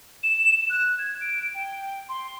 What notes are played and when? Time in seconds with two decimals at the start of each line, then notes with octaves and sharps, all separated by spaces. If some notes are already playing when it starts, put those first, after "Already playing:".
0.23 E7
0.70 F#6
0.99 G#6
1.21 D7
1.54 G5
2.09 C6